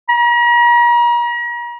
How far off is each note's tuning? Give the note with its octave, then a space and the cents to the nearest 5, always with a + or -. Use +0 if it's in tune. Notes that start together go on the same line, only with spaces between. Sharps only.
A#5 +40